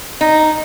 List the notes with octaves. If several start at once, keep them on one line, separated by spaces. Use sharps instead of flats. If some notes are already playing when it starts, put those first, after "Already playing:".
D#4